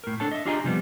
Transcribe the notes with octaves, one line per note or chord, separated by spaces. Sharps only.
A2 A#4
D4 A4 C#5 A5
D#5 E5
D4 F4 G4 G#4 D#5 A#5
C3 F3 G3 B3